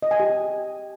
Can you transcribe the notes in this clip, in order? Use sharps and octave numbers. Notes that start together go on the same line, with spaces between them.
D#5
G#5
G4